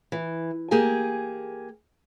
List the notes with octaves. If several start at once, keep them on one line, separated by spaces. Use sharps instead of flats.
E3
A#3 G4 G#4 G#5